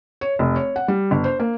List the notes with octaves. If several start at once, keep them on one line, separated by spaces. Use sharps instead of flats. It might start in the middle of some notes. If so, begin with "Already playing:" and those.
C#5
F1
C#5
F#5
G3
G1
C5
A#3